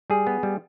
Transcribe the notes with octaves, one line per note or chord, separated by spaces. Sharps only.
G3 G#4
B3
G3